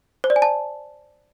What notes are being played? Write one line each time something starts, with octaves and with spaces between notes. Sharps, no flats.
C5
D5
G#5
A5